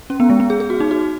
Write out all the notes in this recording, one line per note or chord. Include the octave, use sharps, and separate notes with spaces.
C#4
B3
G#3
B3
G#4
G#4
F#4
D#4
F#4